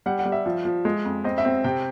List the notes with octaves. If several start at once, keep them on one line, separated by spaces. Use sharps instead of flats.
G3 F#5
F#5
G3
E5
F3
F3
G#3
F2
C4 D#5
E5
C4
C3 G5